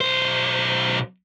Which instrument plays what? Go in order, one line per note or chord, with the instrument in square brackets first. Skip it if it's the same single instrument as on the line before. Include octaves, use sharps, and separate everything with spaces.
[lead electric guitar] B1 C5